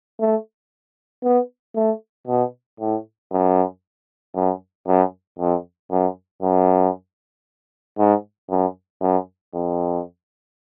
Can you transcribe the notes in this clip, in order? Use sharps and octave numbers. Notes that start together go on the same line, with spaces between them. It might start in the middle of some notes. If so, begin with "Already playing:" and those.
A3
B3
A3
B2
A2
F#2
F#2
F#2
F2
F#2
F#2
G#2
F#2
F#2
F2